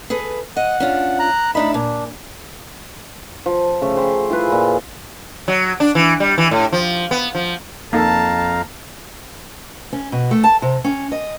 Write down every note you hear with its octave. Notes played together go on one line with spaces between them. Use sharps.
G#4 A4 B4
D#5 F#5
C#4 D4 F4
A#5 F#6
A2 D4 D#4 E5 B5
A#2 D4
F3
C#3 A3
C5 G5 B5
E4 F4 G#4 B4
A#2 B5
F#3
D4
E3
G3
E3
A2
F3
B3
F3
F2 A#3 D#4 A4 F5 A5 A#5
C#4
B2
A3
A5
C3
C#4
D#5